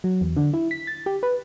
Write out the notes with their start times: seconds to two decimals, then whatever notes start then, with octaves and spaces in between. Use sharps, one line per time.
0.04 F#3
0.21 E2
0.37 D3
0.53 E4
0.71 B6
0.87 A6
1.06 G4
1.23 B4